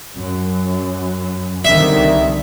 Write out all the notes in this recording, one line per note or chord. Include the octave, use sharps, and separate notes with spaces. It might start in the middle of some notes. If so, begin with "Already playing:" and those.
F#2
C2 D3 D#3 E5